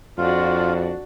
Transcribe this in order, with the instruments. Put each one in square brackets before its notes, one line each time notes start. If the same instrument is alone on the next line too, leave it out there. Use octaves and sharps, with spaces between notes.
[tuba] F2 [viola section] D4 F#4 [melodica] F4